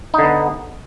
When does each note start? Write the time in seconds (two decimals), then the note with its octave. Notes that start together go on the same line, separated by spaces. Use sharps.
0.14 D#4
0.19 D3
0.23 B3